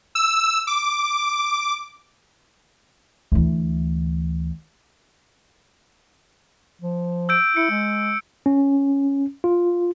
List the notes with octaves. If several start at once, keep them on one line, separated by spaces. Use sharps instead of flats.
E6
D6
D2 E3
F3
E6 G6 D7
E4 C#7
G#3
C#4
F4